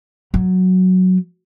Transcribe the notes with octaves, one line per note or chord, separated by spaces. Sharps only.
F#3